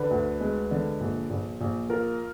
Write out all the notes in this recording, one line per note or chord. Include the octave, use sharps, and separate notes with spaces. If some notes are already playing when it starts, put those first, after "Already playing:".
Already playing: D3 B4
D2
G#3
D3
A#1
A#1
A#1
F4 A#4